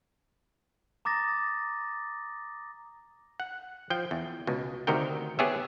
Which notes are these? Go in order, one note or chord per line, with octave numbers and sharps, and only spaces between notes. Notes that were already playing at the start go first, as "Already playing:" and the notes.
A#5 D6 D#6 A6 A#6
F#5
F3 G5
E2
C#2 B2
D2 C3 D#3 F#4 A#4 G5
B3 G4 G#4 C#5 E5